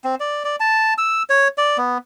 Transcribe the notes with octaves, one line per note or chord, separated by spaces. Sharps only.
C4
D5
D5
A5
E6
C#5
D5
B3